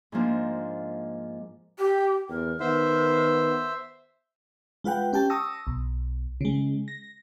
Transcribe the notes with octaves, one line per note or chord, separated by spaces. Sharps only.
G#2 F3 A#3 D4
G4
E2 A#4
D#3 B3 C5 E5
G#3 F4 B4 F#5 G5
C#4 G4 G5 A5
A5 C#6 D#6 E6 A#6
B1
C#3 G#3
A#6